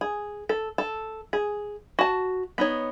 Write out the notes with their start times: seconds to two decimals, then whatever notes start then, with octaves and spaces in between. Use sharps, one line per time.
0.01 G#4
0.49 A4
0.78 A4
1.33 G#4
1.99 F#4 A5
2.58 B3 D#4 C#5